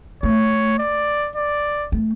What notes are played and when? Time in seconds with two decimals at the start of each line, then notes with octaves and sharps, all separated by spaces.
0.23 A3 C#5
0.79 D5
1.36 D5
1.92 A3